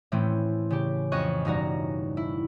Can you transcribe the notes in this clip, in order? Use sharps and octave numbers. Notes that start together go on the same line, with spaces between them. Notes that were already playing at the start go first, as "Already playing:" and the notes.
A2 E3 A3 C4 C#4
C#3 G4
F2 C#4 D#5 C#6 F#6
E1 G2 D#4 F#4 A#5
E4